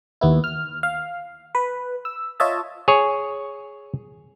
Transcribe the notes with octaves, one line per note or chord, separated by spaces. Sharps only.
D#2 B3 E4
F6
F5
B4
E6
F4 C#5 D#5 E5 A5
G#4 C#5